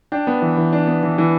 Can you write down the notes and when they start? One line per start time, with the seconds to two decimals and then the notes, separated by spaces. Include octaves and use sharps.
0.12 D4 G5
0.27 B3
0.42 E3
0.57 E3
0.73 D4
0.87 B3
1.03 E3
1.18 E3